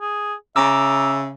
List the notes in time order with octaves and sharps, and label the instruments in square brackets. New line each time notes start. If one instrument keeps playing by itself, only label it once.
[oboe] G#4
[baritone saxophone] C#3 [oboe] E5 [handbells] A#5 D6 E6